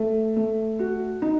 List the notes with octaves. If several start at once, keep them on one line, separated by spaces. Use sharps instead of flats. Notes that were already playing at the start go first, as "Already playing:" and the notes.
Already playing: A3
A3
F#4
D#4